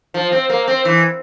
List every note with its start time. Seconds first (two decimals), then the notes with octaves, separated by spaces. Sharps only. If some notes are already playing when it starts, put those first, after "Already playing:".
0.14 F3
0.32 C4
0.50 A#3
0.67 C4
0.85 E3